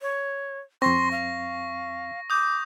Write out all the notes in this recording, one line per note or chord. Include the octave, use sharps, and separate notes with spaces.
C#5
F2 C4 C6 C#6 A#6
F5
D6 D#6 G6